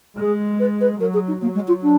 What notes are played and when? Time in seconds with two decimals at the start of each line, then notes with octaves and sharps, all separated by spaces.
0.18 G#3 G#4
0.59 B4
0.80 B4
1.00 F#3 A#4
1.13 G#4
1.27 D#4
1.41 F#3 A#3
1.54 G#3
1.67 F4
1.82 D4